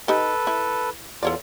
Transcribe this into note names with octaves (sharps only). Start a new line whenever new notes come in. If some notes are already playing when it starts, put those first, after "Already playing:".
D#4 G4 A4 B4
E4
E2 F4 A4 C#5 D5